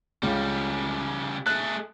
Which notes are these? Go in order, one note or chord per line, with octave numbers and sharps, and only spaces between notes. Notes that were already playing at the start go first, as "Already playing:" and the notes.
C#2 C#3 G3
A3 G#4 F#6